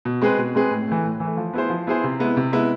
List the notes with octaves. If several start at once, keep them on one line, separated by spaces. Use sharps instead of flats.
B2
G#3 C4 G#4 B4
B2
G#3 C4 G#4 B4
A2
E3 A3
A2
E3 A3
F3
B3 E4 G#4 C5
F3
B3 E4 G#4 C5
C3
G#3 B3 E4
C3
G#3 B3 E4